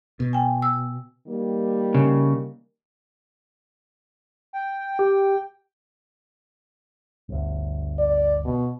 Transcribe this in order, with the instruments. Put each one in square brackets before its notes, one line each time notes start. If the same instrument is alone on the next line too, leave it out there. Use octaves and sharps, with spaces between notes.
[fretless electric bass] B2
[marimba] G5 G#5
E6
[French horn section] D#3 G3 A#3
[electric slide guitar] C#3
[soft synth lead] G5
[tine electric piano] G4
[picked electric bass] G1 D2
[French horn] D5
B2